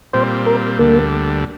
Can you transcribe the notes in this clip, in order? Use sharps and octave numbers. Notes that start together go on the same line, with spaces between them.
A#2 G3 C4 C5
A#4
D2 D3 G3 A#3